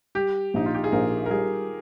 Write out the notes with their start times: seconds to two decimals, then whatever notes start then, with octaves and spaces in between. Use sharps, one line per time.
0.15 G3 G4
0.54 A#1 D#4
0.66 F4
0.74 G4
0.84 G#4
0.92 A#1 A#4
1.26 A#4
1.30 G3 G#4